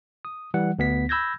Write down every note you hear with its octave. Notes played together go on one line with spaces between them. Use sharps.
D#6
E3 G3 F#5
D2 B3 B6
B5 E6 G6 G#6 A#6